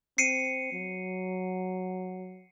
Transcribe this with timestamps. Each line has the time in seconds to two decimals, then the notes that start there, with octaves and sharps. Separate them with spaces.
0.18 C4 C7 C#7 D#7
0.73 F#3